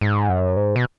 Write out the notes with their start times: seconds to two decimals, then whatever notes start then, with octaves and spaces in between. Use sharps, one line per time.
0.01 G#2
0.29 F#2
0.56 G#2
0.76 B2